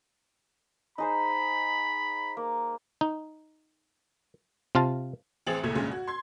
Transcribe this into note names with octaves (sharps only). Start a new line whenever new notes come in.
D#4 G#4 C5 B5
A#3
D#4
C3 F4 F5 A5
A1 C4 G#4 A6 F7 F#7
F#1 C#2 A#2 A3 G#6
D2 G2 A#2 G#3 C#4
F#4
C6 G#6